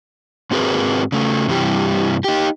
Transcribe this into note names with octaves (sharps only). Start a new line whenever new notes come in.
G#2 C4 F#4 G#4 A#4 B4
C#3 A3
G2 C3 E3 G3 G4
D#4 G4